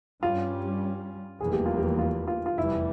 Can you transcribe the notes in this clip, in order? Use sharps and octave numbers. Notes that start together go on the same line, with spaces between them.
G2 G3 C#4 F4
F1 E2 E3 G3 A#3 G#4
G4
F4
G4
F4
F4
F4
F1 E2 E3 G3 E4